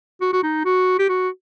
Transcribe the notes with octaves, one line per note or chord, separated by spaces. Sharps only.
F#4
F#4
D#4
F#4
G4
F#4